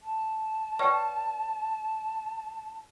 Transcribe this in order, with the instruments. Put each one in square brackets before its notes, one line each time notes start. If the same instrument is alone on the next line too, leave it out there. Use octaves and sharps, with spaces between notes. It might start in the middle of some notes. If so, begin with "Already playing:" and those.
[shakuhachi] A5
[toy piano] B4 D5 G5 [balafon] C#5 C#6